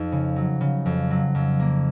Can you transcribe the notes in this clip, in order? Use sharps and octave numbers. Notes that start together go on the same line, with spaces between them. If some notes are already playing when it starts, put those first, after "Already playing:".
Already playing: F2 D#4
C#3
F#3
C#3
F2
F#3
F2
A#3